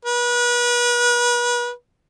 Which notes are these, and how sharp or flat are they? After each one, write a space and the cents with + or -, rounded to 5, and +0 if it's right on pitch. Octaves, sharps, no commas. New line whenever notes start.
B4 -35